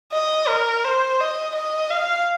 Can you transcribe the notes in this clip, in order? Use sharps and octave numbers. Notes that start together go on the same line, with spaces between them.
D#5
A#4
C5
D#5
D#5
F5